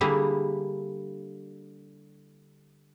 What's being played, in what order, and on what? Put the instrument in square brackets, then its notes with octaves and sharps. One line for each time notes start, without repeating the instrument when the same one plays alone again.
[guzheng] D3 G3 A#3 E4 G#4